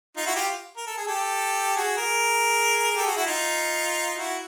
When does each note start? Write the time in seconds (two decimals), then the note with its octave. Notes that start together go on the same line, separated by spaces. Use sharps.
0.17 D#4 F4
0.26 E4 F#4
0.36 F4 G4
0.77 A#4
0.87 A4
0.97 G#4
1.07 G4 A4
1.76 F#4 G#4
1.96 G#4 A#4
2.91 A#4
2.96 G4 A4
3.06 F#4 G#4
3.16 E4 F#4
3.26 D#4 F4
4.16 E4 F#4